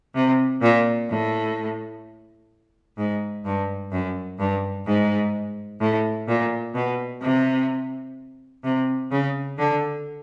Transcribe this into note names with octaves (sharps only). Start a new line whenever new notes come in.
C3
A#2
A2
G#2
G2
F#2
G2
G#2
A2
A#2
B2
C3
C3
C#3
D3